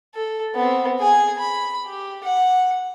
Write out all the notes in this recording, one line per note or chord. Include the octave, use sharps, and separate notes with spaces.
A4
B3 C4
G#4 G#5
B5
G4
F#5